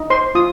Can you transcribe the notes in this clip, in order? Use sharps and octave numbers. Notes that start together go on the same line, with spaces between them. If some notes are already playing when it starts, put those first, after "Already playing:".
Already playing: D#4
C5 C6
F4 D#6